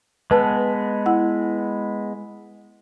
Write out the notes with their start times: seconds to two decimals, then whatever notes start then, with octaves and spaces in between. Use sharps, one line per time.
0.31 G#3 B3 B4 A5
1.06 E4 F#5